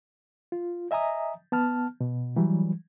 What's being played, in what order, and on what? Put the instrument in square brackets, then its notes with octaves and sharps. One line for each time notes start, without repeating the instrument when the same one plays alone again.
[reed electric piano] F4
D#5 E5 G#5 A#5 D#6
B3 A5 F6
B2
E3 F#3 G3